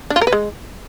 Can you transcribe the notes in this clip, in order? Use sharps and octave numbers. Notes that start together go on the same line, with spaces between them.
D4
F4
A#4
B4
G#3